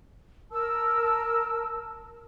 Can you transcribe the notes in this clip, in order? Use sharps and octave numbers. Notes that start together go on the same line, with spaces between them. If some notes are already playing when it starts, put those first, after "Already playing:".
A#4 A5 E6